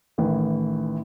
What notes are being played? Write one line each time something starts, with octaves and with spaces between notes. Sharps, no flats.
A1 D#3 E3